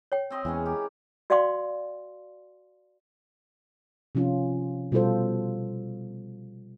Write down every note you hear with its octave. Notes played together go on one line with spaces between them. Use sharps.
C#5 G5
C4 D#5 C6
E2 E3 G#3 C#4
G4 A#4
F#4 D5 F5 G5 C6 D6
C3 F3 C#4 F4
B2 G3 F4 A4 C5